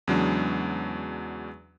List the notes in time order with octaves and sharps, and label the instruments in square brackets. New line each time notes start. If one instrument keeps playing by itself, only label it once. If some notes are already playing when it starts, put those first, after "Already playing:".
[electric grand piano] E2 C#3 F#3 G#3 D4